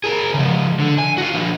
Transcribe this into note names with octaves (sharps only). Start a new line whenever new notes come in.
G#4 A#4
C#3 F3
D3
G#5
F#4 F5
F3 D4